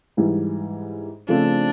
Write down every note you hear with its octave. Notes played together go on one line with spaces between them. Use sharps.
G#2 E3 G3
C#3 F3 A3 C4 D4